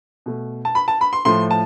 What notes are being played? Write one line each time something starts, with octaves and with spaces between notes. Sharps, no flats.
B2 A3
A5
B5
A5
B5
C6
A2 F3 A3 C6
A5